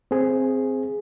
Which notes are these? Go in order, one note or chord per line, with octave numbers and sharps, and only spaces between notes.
C4 G#4